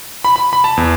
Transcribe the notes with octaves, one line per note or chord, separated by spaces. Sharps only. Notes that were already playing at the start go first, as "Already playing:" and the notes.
B5
B5
B5
A5
E2